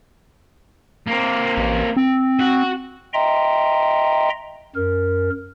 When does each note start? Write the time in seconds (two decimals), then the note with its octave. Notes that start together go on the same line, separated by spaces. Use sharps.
1.07 A#3 C4
1.57 A1
1.97 C4
2.40 F#4
3.14 D#5 E5 G5 A#5 C6
4.76 F#2 A#4